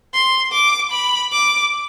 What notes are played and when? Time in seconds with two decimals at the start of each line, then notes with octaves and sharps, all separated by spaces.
0.14 C6
0.53 D6
0.92 B5
1.32 D6